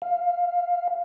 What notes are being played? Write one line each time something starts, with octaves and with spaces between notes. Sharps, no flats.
F5